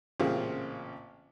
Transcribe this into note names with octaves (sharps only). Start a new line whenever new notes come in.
A1 A#2 C#3 C4 F4